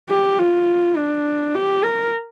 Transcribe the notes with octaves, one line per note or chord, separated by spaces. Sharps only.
G4
F4
D4
G4
A#4